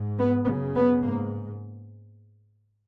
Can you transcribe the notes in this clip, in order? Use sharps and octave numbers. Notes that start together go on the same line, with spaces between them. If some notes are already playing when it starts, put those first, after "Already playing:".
Already playing: G#2
B3
F#2 C#3 B3
B3
G#2 A#3